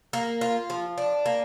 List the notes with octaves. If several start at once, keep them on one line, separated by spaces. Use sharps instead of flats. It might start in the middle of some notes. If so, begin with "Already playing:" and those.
A#3
F4
F3
D4
A#3